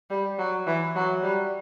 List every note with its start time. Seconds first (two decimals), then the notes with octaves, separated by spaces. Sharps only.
0.10 G3
0.38 F#3
0.67 E3
0.96 F#3
1.23 G3